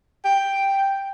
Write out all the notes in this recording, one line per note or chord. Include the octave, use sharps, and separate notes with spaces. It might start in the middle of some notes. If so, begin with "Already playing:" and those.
G5